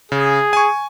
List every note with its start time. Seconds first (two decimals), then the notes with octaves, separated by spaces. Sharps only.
0.12 C#3 G#4
0.53 G#5 C#6